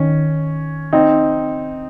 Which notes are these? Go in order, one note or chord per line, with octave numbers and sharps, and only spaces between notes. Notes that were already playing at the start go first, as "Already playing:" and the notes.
Already playing: D#3 C#4
C4 D#4